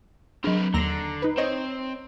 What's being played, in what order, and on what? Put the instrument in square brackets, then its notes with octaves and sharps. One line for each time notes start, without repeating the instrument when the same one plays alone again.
[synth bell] F#3 D4 [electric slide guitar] C4 A#4 B4
[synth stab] D#2 A#6 [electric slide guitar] D3 [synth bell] A#5 C7
[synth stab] D#4 B4
[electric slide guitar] C4 [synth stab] C5 C#5 D#5